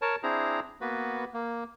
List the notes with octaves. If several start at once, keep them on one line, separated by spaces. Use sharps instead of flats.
A#4 C#5 A5
C4 D4 E4 G#4 C5 A#5
A#3 B3 F#4 B4
A#3